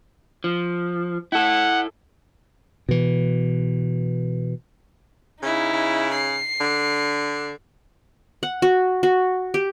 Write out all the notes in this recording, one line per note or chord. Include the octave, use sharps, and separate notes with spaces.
F3
E4 A4 F#5
B2 E3
C#3 D#4 E4
C#3
C7
D3
F#5
F#4
F#4
G4